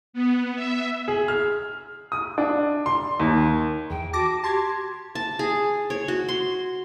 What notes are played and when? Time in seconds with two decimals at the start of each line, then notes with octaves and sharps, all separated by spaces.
0.13 B3
0.55 E5
1.08 G#4
1.28 F6
2.12 D#6
2.38 D4
2.86 C6
3.20 D#2
3.90 E2 G5
4.13 F#4 A5 D6 A#6
4.44 G4 A5 C6 G#6
5.15 A5
5.39 G#4
5.90 C#5
6.08 F#4
6.29 C6